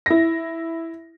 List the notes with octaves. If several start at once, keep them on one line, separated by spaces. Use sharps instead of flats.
E4 A#6